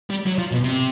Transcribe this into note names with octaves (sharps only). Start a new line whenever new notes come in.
G3
F#3
F3
B2
C3